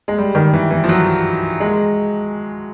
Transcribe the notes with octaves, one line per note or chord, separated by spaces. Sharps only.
G#3
G3
D#3
E3
E3
F3
F#3
G#3